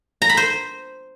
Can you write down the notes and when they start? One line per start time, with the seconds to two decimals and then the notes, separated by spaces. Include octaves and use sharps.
0.22 A#5
0.29 B5
0.37 C5